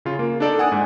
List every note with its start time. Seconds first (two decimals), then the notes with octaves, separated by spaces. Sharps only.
0.05 C#3 F4
0.19 A#3
0.40 D4 D#4 A4 D5
0.59 F#5 G#5 D#6
0.72 G#2